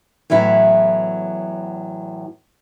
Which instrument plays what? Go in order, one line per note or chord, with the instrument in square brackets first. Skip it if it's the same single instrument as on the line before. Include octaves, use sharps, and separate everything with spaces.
[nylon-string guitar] E2 A2 F#3 E4